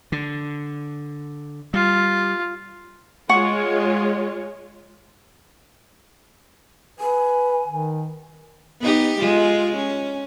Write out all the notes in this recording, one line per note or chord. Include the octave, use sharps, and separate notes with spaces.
D3
G3 F4
G#3 F4 C#5 F#5 C#6
B4 G#5
D#3
B3 D#4 G4
G#3 F4
C#4